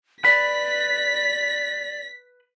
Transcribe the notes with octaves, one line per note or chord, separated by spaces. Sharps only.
B4 D5 B5 B6